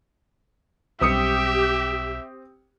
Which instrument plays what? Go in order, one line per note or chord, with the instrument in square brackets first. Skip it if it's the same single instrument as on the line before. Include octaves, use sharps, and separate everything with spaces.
[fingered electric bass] B1 G3 [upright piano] C4 D#6 C#7 [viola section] G4 [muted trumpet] E5